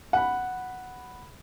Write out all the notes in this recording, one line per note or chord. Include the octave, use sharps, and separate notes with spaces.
F#5 B5